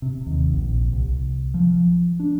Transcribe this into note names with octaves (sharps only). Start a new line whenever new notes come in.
C3
D#2
A#1
C2
F3
D4